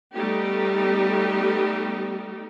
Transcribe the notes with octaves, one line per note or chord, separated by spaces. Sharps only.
G3 A3 B3 D#4 G4